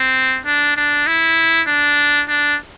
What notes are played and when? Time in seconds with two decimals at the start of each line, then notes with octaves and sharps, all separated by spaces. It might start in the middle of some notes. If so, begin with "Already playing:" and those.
Already playing: C4
0.46 D4
0.77 D4
1.07 E4
1.68 D4
2.29 D4